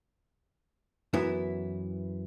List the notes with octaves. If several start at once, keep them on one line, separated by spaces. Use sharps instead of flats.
F#2 E3 B3 E4